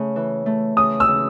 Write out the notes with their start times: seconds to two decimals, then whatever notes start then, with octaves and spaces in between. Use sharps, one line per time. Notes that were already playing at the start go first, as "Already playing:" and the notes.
Already playing: C#3 A3
0.16 E3
0.46 A3
0.77 C#3 D#6
1.00 E6
1.08 C#3